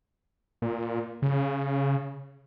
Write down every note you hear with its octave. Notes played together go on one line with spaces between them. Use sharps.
A#2
C#3